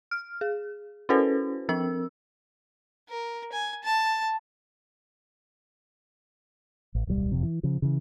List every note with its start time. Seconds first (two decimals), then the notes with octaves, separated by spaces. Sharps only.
0.11 F6
0.41 G#4
1.09 C#4 E4 F#4 A4 B4 C5
1.69 F3 C4 A#4 E6
3.09 A#4
3.52 G#5
3.84 A5
6.95 A1
7.07 D1 B1 F3 G3
7.32 F#1 F2 C3
7.43 E3
7.63 C#3 F3
7.82 C#3 E3